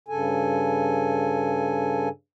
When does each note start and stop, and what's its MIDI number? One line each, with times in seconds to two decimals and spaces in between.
0.08 2.09 43
0.08 2.09 49
0.08 2.09 69
0.08 2.09 80